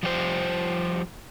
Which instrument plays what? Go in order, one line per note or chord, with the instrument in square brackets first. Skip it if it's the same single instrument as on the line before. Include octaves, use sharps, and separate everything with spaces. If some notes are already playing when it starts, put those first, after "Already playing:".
[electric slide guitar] F3 G3 G4 C5